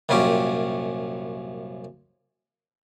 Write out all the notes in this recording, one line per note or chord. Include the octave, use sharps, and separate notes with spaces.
C2 F#2 A#2 C#4 G4